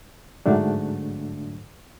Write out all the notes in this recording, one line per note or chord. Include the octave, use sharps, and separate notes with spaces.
G#2 D3 F#3 A3 D4